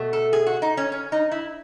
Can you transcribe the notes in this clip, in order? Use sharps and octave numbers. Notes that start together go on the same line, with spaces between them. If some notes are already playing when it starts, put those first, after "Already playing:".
Already playing: B2 A3
A4
G#4
F#4
D#4
C#4
C#4
D#4
E4